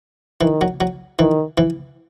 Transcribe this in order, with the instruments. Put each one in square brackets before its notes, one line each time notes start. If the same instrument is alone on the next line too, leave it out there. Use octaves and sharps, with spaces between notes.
[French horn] D#3 [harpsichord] E3
[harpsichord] F#3
F#3
[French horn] D#3 [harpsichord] E3
[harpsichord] E3